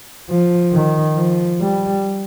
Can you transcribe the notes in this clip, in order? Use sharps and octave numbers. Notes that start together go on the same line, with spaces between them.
F3
D#3
F3
G3